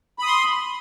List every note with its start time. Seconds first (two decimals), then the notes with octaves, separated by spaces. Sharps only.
0.19 B5
0.23 D#6
0.27 C6